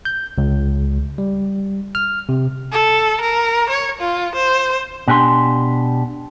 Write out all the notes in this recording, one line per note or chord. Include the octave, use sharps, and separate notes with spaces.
G6
C#2
G3
F6
C3
A4
A#4
C#5
F4
C5
B2 D4 G4 G#5 C6